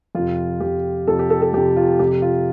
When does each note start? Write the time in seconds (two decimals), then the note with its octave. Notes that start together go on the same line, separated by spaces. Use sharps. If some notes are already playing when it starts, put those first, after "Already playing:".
0.15 F2 C3 F4
0.60 F2 C3 G4
1.07 F2 C3 A4
1.19 G4
1.30 A4
1.42 A4
1.53 F2 G4
1.57 C3
1.76 F4
1.99 F2 C3 G4
2.22 F4